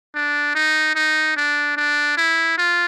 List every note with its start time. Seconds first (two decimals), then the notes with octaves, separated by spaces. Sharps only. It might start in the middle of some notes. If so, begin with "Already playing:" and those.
0.14 D4
0.55 D#4
0.95 D#4
1.36 D4
1.77 D4
2.17 E4
2.57 F4